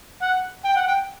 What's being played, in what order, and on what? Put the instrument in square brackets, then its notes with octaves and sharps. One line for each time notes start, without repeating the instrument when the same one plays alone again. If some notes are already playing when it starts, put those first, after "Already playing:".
[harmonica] F#5
G5
F#5
G5